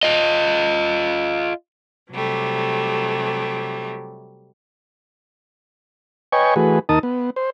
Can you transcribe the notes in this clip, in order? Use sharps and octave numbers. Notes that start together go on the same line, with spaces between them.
F4 D#5
C3 F#3 G3 A3
B4 C#5 D#5 G5 G#5 C#6
E3 A3 F#4 G#4 B4
D#2 D#4 A#4 A5 D#6
B3
C5